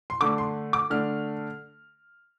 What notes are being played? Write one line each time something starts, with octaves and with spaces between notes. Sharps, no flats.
C6
D3 A3 D4 D6
C6
D6
D3 A3 D4 F6